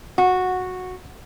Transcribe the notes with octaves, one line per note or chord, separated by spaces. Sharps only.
F#4